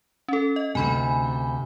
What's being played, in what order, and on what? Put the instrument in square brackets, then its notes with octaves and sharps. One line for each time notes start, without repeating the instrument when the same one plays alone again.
[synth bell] C#4 A4
D#5
[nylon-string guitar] D2 C3 [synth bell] G#5 B5